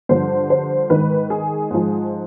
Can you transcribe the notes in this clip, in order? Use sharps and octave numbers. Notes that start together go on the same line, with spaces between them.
G2 D3 F3 C5
C5
G#2 D#3 B4
G#4
G#2 F3